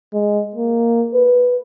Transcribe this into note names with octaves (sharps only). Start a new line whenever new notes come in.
G#3
A#3
B4